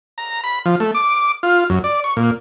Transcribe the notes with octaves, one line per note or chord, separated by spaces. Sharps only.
A#5
B5
F3
A3
D6
F4
F#2
D5
C#6
A#2